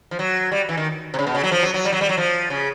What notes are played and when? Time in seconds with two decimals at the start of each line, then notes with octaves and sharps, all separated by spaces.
0.11 F3
0.19 F#3
0.52 G3
0.69 E3
0.77 D#3
1.14 C3
1.19 C#3
1.27 B2
1.35 C#3
1.43 F#3
1.51 F3
1.63 F#3
1.74 F#3
1.85 G3
1.92 F#3
2.01 G3
2.09 F#3
2.17 F3
2.50 C#3